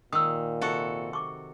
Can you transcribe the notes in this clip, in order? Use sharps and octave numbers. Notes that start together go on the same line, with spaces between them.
A#2 D#3 D#6 E6
C3 F#4 A4
C#6 D6